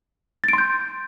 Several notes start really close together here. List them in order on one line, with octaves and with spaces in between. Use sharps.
A6 D7 C6 G6